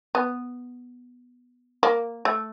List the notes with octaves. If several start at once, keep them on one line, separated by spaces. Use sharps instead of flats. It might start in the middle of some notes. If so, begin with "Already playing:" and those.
B3
A#3
A3